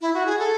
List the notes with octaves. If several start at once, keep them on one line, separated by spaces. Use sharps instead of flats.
E4
F#4
G#4
A4